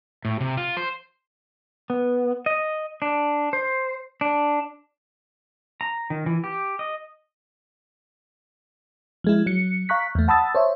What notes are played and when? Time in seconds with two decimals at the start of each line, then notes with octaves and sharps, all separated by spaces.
0.25 A2
0.41 C3
0.57 F4
0.77 C5
1.90 B3
2.46 D#5
3.02 D4
3.53 C5
4.21 D4
5.81 A#5
6.10 D#3
6.26 E3
6.44 G4
6.79 D#5
9.24 F3 G#3 E4
9.46 F#3 C#7
9.89 F5 A#5 C#6 F#6 B6
10.15 E2 A3
10.28 F#5 A5 B5 D#6 E6 A6
10.55 C5 C#5 E5